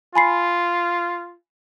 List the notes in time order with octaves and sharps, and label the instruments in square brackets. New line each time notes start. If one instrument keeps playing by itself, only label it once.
[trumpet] F4 [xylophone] G#5 B5 C7